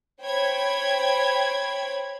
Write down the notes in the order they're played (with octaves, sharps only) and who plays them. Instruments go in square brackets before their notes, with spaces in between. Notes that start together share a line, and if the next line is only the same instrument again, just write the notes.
[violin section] C5 C#5 G5 B5 G#6